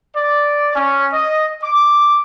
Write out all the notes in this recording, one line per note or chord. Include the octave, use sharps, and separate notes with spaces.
D5
C#4
D#5
D6